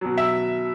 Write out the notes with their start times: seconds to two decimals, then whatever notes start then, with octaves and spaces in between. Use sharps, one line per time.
0.01 B2 F#3
0.18 E5